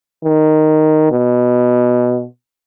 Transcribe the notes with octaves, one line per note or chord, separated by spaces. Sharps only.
D#3
B2